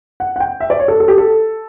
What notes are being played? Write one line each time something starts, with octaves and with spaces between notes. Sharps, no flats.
F#5
F#5
G5
E5
D5
C#5
A4
A4
G4
A4